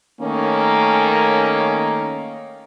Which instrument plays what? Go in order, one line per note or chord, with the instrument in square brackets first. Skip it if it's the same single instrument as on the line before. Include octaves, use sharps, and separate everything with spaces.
[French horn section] D#3 A3 A#3 C#4